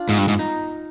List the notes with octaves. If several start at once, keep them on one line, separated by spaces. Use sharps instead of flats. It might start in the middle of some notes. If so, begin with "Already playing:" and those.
Already playing: D4 F4
G#2 B3
G2
G#2
D#4